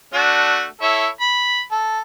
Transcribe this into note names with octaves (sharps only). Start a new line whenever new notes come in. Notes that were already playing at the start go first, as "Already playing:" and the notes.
A3 D4 F#4
E4 A4 C#5
B5
A4